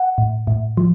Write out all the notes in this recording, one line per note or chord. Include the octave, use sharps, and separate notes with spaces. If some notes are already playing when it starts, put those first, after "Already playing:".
Already playing: F#5
A2
A2
F3